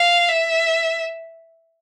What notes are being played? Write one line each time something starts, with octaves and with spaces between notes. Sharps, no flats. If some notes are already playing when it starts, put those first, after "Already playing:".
Already playing: F5
E5